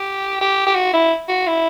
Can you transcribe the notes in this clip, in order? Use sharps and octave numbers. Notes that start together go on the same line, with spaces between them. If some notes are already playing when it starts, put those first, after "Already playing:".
Already playing: G4
G4
G4
F#4
E4
F#4
E4